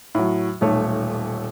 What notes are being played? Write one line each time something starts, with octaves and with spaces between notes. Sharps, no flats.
A2 F#3
D#1 B1 A3 C#5